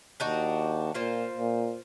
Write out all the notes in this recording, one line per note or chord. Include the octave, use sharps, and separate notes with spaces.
D#2 D4 D#4 F#4
A#2 A#3 F4 C5
A#2